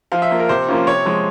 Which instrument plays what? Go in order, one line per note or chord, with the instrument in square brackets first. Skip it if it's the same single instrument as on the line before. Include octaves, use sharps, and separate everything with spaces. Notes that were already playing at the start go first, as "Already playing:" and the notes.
[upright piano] F3 F5
E5
A#3 F4
A#4
C3 C5
F3 A#3 C#4 F4
C3 C#5
F3 G#3